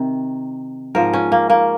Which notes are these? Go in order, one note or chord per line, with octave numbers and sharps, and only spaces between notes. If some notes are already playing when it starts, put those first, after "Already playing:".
Already playing: C3 D#3
G#2 F3 A#4
C#4
A#3
A#3